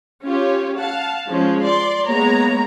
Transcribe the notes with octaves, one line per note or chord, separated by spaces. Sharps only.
C#4 F4 G4 C#5
F5 F#5 A5
F3 G#3 C#4
D5 C6
G#3 A#3 B3 C#5 A#5